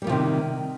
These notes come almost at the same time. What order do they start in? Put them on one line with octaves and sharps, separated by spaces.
G3 A#3 F3 C3 D#3